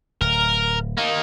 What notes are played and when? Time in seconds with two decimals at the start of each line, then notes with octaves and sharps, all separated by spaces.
0.21 D1 A#4
0.97 A#3 D#4